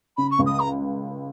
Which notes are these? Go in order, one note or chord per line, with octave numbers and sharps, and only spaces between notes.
C#3 B5
C#6
C#2
D#6
A#5